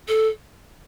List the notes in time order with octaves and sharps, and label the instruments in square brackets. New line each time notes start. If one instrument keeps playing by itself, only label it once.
[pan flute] A4